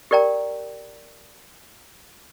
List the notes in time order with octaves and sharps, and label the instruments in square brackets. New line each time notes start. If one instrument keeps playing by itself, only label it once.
[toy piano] G4 A#4 D5 G5 A#5